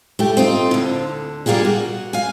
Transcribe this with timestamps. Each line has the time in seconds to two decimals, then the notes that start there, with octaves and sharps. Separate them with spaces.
0.19 A3 G4
0.37 C4 D#4 F4
0.71 D2 D3
1.46 G3 A#3 F4 G4 G#4
1.65 F#4
2.13 F5 G#5